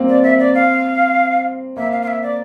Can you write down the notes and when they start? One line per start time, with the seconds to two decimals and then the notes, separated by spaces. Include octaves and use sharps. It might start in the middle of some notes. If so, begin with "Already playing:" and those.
Already playing: G3 A#3 C4
0.09 D5
0.23 E5
0.39 D5
0.55 F5
1.77 A#3 E5
1.92 F5
2.02 F5
2.07 E5
2.22 D5